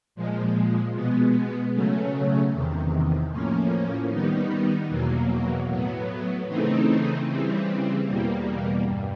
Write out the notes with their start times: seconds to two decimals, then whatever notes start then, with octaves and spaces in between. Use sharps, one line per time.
0.15 A#2 F3 G#3
0.94 B2 G#3 B3
1.73 C#3 F#3 A3 C#4
2.53 E2 C3 D#3
3.31 A2 F3 A#3 C#4
4.10 D#3 G3 B3 D#4
4.89 E2 B2 F#3 A#3
5.68 A2 F#3 B3
6.47 C#3 E3 A3 C4 D#4
7.26 C#3 E3 G3 C4
8.06 E2 B2 G3 A#3
8.85 G2